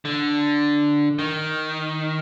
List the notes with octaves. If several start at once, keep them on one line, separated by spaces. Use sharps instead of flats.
D3
D#3